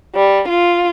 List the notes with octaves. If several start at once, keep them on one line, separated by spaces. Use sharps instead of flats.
G3
F4